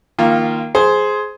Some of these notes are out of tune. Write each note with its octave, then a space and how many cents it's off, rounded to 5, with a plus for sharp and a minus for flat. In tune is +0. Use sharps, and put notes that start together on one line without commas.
D#3 +0 A#3 +0 F4 -20
G#4 +10 C5 +0